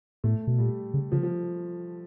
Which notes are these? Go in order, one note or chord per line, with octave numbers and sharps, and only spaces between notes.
A2 A3
B2
A#2 G3
C#3
C#3 F3
F3